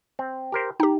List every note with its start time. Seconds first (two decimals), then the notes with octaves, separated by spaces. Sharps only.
0.19 C4
0.52 G4 A#4 C5
0.80 D#4 G4 G5 A#5